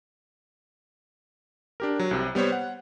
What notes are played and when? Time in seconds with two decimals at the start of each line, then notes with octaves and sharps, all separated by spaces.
1.80 D4 G4 A#4
1.99 F#3
2.11 C2 C3
2.35 G3 B3 C5 C#5
2.52 F#5